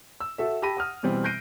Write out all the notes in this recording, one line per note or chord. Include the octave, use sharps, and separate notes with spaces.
E6
F#4 A4 E5
G4 A5 B5 A#6 D#7
F#5 D#6 F6
B2 E3 G3 C4
F#6 G6 A#6 C7 D7 D#7